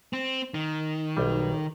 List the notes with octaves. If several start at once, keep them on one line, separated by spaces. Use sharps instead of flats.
C4
D#3
B1 G3